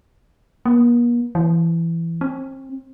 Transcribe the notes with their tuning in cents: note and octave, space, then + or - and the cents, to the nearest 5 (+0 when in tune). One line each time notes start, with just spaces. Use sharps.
A#3 +45
E3 +15
C4 +35